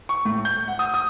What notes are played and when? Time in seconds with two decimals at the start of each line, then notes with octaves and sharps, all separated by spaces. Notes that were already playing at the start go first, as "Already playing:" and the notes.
0.09 C#6
0.25 A2
0.45 G6
0.68 F#5
0.79 D#6
0.94 D#6